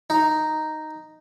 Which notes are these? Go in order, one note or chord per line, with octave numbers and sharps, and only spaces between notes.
D#4